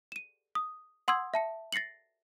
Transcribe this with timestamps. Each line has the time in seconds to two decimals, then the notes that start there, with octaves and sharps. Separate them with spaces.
0.12 D#7 E7
0.55 D#6
1.08 F#5 C6 D#6 E6 G#6
1.34 E5 A5 C#7
1.72 A6 A#6 C7 C#7 F#7